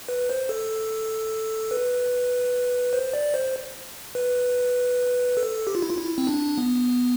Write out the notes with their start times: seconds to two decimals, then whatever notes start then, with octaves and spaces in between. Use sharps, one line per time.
0.08 B4
0.30 C5
0.49 A4
1.71 B4
2.93 C5
3.13 D5
3.34 C5
4.15 B4
5.37 A4
5.67 G4
5.75 F4
5.82 E4
5.90 F4
5.98 E4
6.18 C4
6.27 D4
6.58 B3